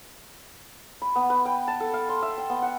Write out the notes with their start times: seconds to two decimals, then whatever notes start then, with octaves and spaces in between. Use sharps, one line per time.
1.02 B5
1.16 B3
1.30 B4
1.45 G5
1.68 A5
1.80 A4
1.94 F5
2.09 C6
2.22 E5
2.38 G5
2.50 B3
2.62 F#5